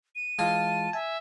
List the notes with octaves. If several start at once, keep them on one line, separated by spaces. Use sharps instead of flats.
D#7
E3 G#3 F4 A5
E5 G#5